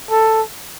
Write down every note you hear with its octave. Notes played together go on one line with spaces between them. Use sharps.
A4